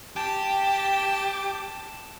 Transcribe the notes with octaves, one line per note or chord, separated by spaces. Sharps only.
G4 A5